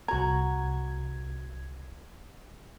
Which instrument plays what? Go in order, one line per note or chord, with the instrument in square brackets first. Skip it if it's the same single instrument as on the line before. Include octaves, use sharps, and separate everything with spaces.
[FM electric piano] C2 G#6 [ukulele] F#4 A#5